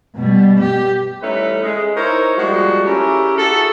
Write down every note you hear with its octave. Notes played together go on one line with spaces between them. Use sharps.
B2 G3
G4
E3 G3 A3 C#4 D#4 B4
G#3
D#4 E4 A#4 C5 C#5
F3 G3 G#3 A#3 F#4
A3 C#4 E4 G4 G#4 A#4
E4 F#4 G#4 A4